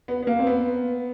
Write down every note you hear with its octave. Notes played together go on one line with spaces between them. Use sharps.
B3
B3
A#3
C4
B3